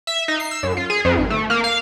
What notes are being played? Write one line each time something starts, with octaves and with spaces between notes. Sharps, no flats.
E5
D#4
C7
E6
F#2
F4
G#4
F2
G#1
A3
A#3
F5